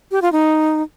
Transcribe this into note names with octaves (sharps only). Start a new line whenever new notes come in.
G4
F4
D#4